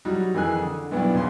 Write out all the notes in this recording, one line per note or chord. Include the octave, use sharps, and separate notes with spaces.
F#3 G3 D#4 F#4
F2 D#3 E3 G#4 G#5 F#6
D3
B1 G2 B3 D4 E4
E2 C#3 C6